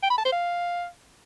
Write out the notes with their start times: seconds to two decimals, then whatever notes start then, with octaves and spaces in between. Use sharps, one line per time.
0.03 G5
0.10 B5
0.18 A5
0.25 C5
0.32 F5